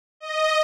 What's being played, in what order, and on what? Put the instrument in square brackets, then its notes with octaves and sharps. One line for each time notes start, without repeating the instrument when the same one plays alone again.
[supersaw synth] D#5